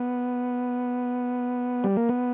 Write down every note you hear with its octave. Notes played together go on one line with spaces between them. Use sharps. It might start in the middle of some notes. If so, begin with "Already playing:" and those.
Already playing: B3
G3
A#3
B3